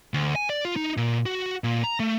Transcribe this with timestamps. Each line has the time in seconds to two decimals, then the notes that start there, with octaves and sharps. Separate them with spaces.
0.14 D2
0.36 G#5
0.50 D5
0.65 F4
0.76 D#4
0.97 A#2
1.26 F#4
1.64 A#2
1.84 A#5
2.00 A3